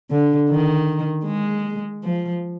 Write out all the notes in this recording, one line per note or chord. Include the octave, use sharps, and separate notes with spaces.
D3
D#3
G#3
F3